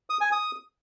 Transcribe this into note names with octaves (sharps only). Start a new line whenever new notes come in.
D#6
G#5
D#6